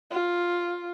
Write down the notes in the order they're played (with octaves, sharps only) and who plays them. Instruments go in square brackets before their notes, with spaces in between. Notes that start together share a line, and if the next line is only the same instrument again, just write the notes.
[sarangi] F4